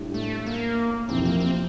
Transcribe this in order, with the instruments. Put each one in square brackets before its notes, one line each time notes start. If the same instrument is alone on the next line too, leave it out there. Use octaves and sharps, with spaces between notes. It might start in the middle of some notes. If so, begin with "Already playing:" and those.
Already playing: [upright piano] A2 G3 D4
[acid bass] A3
A#3
[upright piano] F2 C3 E3 [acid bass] C4
[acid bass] A#3
C4